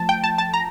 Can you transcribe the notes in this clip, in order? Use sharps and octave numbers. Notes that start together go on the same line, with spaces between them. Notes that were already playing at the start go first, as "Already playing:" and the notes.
Already playing: F3 A3 A5
G5
A5
A5
A#5